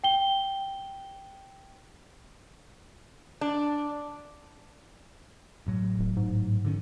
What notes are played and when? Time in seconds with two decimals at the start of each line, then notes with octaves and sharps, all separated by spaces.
0.04 G5 G7
3.41 D4
5.66 A1 A2 F#3
5.99 D1
6.16 G#2
6.65 D3 D#3 C#4